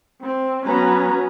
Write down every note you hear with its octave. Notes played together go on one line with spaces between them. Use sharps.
C4
F#3 B3 C#4 F#4 B4 A#5